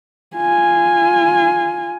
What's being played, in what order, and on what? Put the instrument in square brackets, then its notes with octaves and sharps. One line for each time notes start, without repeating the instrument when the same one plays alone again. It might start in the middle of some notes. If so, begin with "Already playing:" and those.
[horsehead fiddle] F4 G#5